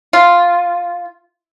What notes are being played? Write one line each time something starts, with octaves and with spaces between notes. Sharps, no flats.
F4